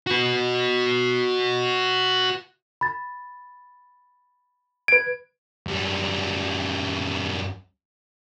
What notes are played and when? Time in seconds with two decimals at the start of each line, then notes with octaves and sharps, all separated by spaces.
0.07 F#4 B4
2.81 B5 A6
4.88 B4 G#6 D7
5.67 F#2 G3